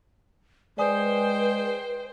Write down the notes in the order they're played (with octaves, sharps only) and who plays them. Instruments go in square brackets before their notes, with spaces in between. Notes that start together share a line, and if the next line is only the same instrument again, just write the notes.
[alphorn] G#3 [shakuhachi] B4 [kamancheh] C5 G5 [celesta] D5 G#5 D#6